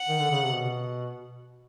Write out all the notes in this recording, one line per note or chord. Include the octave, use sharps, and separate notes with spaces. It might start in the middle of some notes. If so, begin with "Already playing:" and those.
Already playing: F#5
D#3
D3
C#3
C3
B2